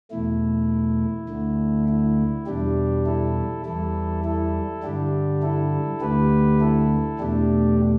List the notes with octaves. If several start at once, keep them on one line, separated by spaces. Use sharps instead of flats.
E2 B2 A3 E4
D2 D3 A3
E4
E2 B2 G3 D4 G4
E4 A4
E2 E3 G3 E4 A4
E4 A4
G2 D3 G3 D4 G4
E4 A4
D2 D3 A3 G4 B4
E4 A4
E2 B2 A3 D4 G4